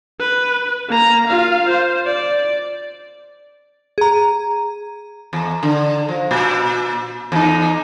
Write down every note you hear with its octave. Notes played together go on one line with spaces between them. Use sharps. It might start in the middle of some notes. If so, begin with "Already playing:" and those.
B4
A#3 A#5
F4 F5
C5
D5
G#4 A#5
E2
D3
F3
A#2
E2 D#4